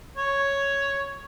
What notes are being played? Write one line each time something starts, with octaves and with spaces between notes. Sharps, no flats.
C#5